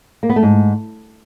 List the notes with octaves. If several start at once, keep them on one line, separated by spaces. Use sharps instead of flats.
A#3
B3
A3
G#2